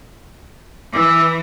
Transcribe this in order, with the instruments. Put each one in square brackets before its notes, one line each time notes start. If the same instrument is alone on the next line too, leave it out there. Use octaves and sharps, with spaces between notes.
[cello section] E3 [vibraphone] D6 E6